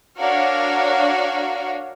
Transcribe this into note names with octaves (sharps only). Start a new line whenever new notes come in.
D4 F#4 A#4 C#5 F5